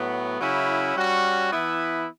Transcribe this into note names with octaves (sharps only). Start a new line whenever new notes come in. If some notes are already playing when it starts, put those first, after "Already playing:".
Already playing: A2 F#3 B3
C#3 F#3 C#4 E4
G3 C#4 F#4
E3 B3 E4